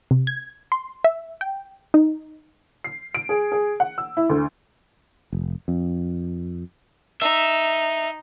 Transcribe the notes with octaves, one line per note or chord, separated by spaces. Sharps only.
C3
G#6
C6
E5
G5
D#4
C7
D7
G#4
G#4
F#5
E6
E4
D2
F1
F2
D#4 E5